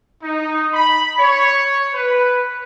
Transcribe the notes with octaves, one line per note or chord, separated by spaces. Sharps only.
D#4
B5
C#5
B4